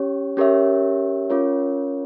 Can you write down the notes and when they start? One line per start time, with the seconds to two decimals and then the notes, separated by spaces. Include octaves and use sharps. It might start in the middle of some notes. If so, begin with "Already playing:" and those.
Already playing: C#4 G4 C#5
0.37 C#4 G4 A#4 C#5 E5
1.30 C#4 F4 A#4 C#5